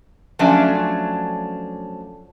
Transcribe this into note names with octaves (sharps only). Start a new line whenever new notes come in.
F3 F#3 A3 C#4 D4